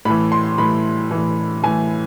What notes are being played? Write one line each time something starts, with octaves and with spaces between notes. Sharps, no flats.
A2 E3 B5
C6
A2 E3 B5
A2 E3
A2 E3 G#5